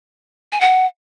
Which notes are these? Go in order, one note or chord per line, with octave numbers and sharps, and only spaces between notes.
G#5
F#5